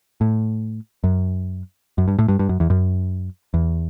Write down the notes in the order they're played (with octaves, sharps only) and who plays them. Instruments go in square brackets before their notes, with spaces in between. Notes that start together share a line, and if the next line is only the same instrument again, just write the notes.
[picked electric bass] A2
F#2
F#2
G2
A2
G2
G2
F#2
E2
F#2
E2